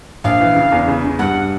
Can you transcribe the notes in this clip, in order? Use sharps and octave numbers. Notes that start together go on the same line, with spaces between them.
A#1 F5
E3
C#3
E2
C#3
C#3
G2 F#5